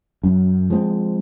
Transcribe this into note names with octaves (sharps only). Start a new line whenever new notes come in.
F#2
F3 G#3 C4